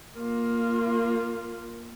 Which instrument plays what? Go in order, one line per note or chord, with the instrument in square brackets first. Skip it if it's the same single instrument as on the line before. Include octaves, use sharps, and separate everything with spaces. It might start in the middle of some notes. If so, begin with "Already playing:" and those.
[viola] A#3 F4